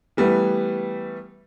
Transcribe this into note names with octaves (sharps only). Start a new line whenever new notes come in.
E3 G3 A3 B3